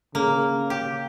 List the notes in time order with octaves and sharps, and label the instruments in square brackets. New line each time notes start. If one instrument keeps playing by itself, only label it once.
[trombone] C#3 [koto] A#3
[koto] G4